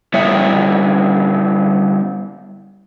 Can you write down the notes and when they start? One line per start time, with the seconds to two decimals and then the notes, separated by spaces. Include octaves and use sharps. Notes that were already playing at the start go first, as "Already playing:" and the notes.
0.14 G3 B3 E4 C#5 E5